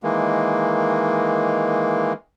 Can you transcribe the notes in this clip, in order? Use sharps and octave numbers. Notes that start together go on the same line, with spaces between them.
D#3 E3 G#3 A#3